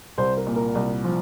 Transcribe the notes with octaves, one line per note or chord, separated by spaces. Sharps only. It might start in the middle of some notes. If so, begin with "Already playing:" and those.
C2 C5
A#4
A#2
A#4
C2
F3